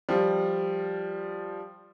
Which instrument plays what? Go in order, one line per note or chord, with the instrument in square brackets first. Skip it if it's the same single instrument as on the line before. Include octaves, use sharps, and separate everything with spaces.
[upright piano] F3 G3